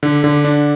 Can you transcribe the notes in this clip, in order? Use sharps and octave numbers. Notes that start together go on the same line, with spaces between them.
D3
D3
D4